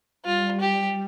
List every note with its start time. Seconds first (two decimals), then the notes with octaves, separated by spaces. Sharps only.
0.24 G3 F4
0.60 G4